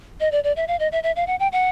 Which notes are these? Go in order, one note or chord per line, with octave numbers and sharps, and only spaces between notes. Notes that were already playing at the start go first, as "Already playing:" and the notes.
D#5
D5
D5
E5
F5
D#5
E5
E5
F5
F#5
G5
F#5